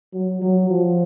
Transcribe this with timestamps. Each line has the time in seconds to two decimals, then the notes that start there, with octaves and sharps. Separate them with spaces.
0.13 F#3
0.42 F#3
0.70 F3